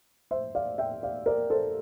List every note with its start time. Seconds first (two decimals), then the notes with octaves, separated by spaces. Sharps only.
0.31 C5 E5
0.55 D5 F5
0.78 E5 G5
1.03 D5 F5
1.26 A#4 D5
1.50 A4 C5